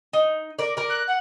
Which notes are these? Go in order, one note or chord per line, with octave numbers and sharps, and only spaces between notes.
D#4
A#4 D5
A#4 D5
F#6
F#5